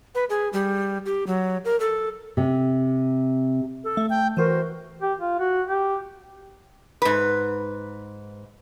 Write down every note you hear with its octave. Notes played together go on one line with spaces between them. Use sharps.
B4
G#4
G3
G4
F#3
A#4
A4
C3
A4
A3
G5
E3 F#4 A#4 C5
G4
F4
F#4
G4
G#2 B4